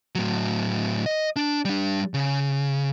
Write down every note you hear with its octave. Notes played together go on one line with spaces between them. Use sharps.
A2 F#3
D#5
D4
G3 D4
C#3